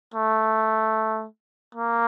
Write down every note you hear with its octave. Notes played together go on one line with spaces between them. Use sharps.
A3
A#3